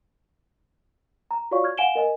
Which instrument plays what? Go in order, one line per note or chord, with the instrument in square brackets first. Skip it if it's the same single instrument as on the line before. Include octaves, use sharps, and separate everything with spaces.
[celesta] A#5
F4 F#4 C#5 D5 F5 C#6
F6 G#6
F5 F#5 G#5 D7 E7 G7
A#4 D#5 G#5